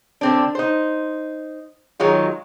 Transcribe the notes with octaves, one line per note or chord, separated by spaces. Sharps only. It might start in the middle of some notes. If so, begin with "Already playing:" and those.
D3 C4 D4
D#4 C5
D#3 F#3 G#3 F4